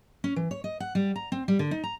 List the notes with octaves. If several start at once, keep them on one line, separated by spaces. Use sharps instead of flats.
C#4
E3
C#5
D#5
F#5
G3
A#5
C4
G3
D3
D#4
A#5